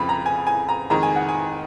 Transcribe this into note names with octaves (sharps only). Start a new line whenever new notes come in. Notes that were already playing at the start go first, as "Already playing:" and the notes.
Already playing: F2 C#3 F3 B5
A#5
G#5
G#5
A#5
F2 D#3 G#3 A#5
G#5
F#5
G#5